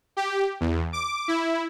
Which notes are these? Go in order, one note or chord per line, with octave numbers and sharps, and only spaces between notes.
G4
E2
D6
E4